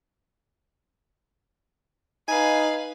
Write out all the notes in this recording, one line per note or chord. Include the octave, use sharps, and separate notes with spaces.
D#4 B4 F5 G#5